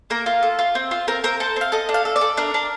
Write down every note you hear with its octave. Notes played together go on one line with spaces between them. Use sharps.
A#3 A#4
F4
A4
F4
C4
F4
C4 A#4
C4 A#4
A4 C5
C4 F5
A4 D#5
D4
F5
A4
D5
A4
D4 A#4
D4